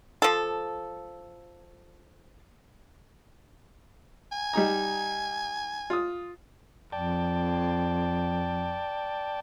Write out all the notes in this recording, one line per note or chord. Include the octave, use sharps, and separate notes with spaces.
F3 A4
G#5
G3 D#4 A#5
F4 D#6
F2 D5 G5 A5